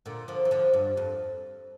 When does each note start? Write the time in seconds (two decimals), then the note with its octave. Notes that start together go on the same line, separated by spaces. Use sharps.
0.06 A#2 D3
0.28 D3 F3
0.45 E3
0.51 D3 F3
0.73 G2
0.97 F2